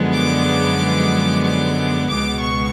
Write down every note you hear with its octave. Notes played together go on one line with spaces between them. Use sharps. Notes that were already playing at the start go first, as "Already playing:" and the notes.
Already playing: F#2 D3 F3 G#3 B3
D6
D6
C#2 B2 G#3 B3 D6
C#6